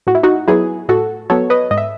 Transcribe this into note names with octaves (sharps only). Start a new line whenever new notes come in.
A2 F#4
E4
D#4 F#4
F#3 B3 E4 G#4
A2 F#4 A4
F#3 B3 A4 C#5
B4 D#5
G#2 D#5
E5